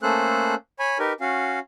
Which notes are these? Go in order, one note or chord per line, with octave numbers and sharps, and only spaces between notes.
A3 A#3 C#4 A4 C5 F#6
C#5 G#5 B5
D#4 G4 A#4 B4
C#4 F#4 F5